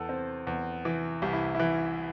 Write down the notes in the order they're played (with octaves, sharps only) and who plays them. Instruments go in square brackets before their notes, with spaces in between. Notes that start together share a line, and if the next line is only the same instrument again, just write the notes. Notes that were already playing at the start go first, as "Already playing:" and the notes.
Already playing: [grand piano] E2 A4
C4
E2
E3
C2 G4
E4
E3 E4